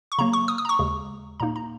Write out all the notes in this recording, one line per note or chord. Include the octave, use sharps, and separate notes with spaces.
C#6
C#3 F#3 A#3 A#5
C#6
D#6
D#6
A#5
C#6
D#2 C#3 G#3
A#2 A#3 D#4 A#5
A#5